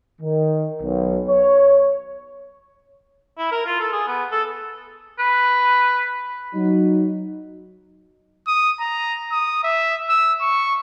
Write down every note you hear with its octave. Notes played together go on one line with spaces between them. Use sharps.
D#3
B1
C#5
E4
A#4
F4
A4
G#4
B3
A4
B4
F#3 D#4
D#6
A#5
D#6
E5
E6
C#6